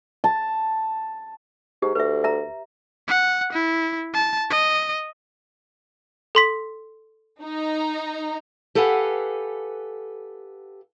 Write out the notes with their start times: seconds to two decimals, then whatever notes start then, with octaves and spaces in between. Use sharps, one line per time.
0.24 A5
1.82 G#2 G4
1.95 D2 B4 E5
2.24 E5 A#5
3.08 F#5
3.53 E4
4.14 A5
4.50 D#5
6.35 A4 C6 B6
7.42 D#4 A#5
8.75 G4 A4 B4 F5 F#5 G#5